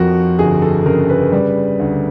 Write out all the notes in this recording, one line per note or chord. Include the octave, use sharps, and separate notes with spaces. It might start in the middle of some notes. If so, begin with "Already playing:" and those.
Already playing: F2 F3 F#4 A#4
G1 G#4
A4
C#3 A#4
B4
G3
D2